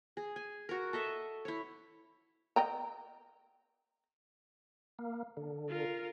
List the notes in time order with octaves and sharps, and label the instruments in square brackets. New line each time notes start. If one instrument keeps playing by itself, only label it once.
[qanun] G#4
G#5
F#4 A#4
A4 D#5 E5
E4 C#5
[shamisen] D#5 G5 A#5
[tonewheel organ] A#3
D3
[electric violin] F4 A#4